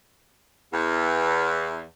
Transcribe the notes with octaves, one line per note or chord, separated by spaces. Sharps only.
E2